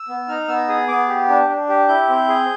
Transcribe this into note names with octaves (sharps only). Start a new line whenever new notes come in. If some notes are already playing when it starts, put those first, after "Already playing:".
Already playing: E6
B3
D#4 F6
B3 E6
G#4 D#6
B3 D6
G4
D4
D4
G4
E4 G6
C4
G#4